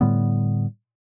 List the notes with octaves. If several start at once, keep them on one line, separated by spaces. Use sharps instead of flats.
A2 D3 G3 B3